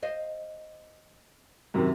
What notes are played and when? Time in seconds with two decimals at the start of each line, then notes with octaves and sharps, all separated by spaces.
0.02 C5 D#5 F5
1.74 F#2 C3 D#3